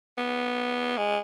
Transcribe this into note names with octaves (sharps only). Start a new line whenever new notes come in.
B3
G#3